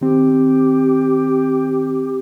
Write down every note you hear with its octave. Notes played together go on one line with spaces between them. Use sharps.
D#3 C4 G4